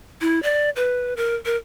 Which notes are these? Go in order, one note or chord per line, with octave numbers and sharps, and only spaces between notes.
E4
D5
B4
A#4
A#4